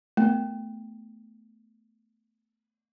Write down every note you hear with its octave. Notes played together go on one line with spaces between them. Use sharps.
A3 B3